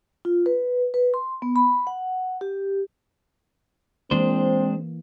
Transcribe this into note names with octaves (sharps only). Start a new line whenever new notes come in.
F4
B4
B4
C6
B3
B5
F#5
G4
E3 G#3 A#3 C4 D4 C5